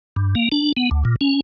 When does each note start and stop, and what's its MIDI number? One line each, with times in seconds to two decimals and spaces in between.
0.16 0.35 43
0.35 0.49 58
0.52 0.72 62
0.77 0.90 59
0.91 1.04 38
1.05 1.16 46
1.21 1.41 61